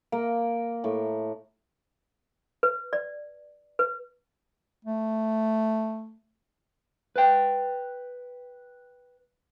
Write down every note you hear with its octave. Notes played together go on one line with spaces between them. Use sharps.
A#3
A2
B4
D5
B4
A3
B4 G5